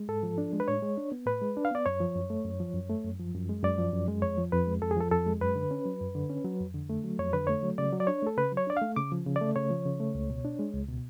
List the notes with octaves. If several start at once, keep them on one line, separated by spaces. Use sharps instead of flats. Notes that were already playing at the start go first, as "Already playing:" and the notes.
Already playing: G#3
G#2 A4
F3
D4
G#3
B4
A2 C#5
G#3
D4
B3
A2 B4
G#3
D4
F5
B3 D5
F#2 C#5
F3
F#2
A3
F#2
F3
F#2
A3
F#2
F3
F#2
G#3
F#2 D5
F3
F#2
G#3
F2 C#5
F3
F2 B4
G#3
F2 A4
G#4
F3 A4
F2 A4
G#3
F#2 B4
D3
C#4
F#3
F#2
D3
C#4
F#3
F2
D3
A3
F#3
F2 C#5
D3 B4
A3 C#5
F#3
C#3 D5
F#3
D5
D4 C#5
A3 A4
C#3 B4
F#3
C#5
D4 D5
F5
A3
C#3 D6
F3
C#3
A3 D5
C#3 C#5
F3
C#3
A3
C#2
B2
D4
G#3
C#2
B2